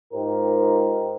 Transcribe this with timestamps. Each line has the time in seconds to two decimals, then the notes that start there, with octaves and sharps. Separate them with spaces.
0.14 G#2 D#4 F4 G4 A#4 C5